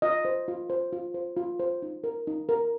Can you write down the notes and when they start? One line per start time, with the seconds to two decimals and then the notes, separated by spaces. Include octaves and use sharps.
0.02 F4 D#5
0.25 C5
0.48 F4
0.70 C5
0.93 F4
1.14 C5
1.37 F4
1.60 C5
1.82 D#4
2.04 A#4
2.27 D#4
2.49 A#4